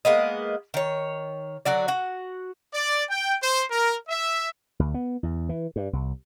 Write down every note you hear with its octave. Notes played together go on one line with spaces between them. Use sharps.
G#3 A#3 B3 D#5
D#3 C#5
D3 F#3 F#4 D5
F#4 F#5
D5
G5
C5
A#4
E5
D2
B3
E2
E3
G2
C2